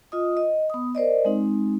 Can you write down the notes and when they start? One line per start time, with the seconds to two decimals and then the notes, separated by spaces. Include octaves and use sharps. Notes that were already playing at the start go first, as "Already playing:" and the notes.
0.12 F4 D#5 D#6
0.37 D#5
0.70 B3 D#6
0.95 A#4 C5 D5 D#5
1.25 G#3 C4 D#4